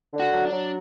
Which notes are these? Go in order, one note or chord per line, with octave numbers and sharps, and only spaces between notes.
D3
F#4
F#3
D4
F#3